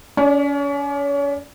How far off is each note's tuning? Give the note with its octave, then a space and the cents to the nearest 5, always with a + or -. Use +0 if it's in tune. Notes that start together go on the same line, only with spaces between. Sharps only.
C#4 +35 D5 +0